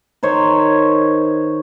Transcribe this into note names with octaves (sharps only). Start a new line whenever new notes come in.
D#3 C5 C#5